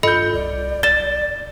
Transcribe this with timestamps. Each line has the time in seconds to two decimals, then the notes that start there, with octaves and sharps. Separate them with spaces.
0.03 G2 F4 A4 D#5 B5 G6 C#7
0.34 C2 D5
0.83 B1 A6 E7 G7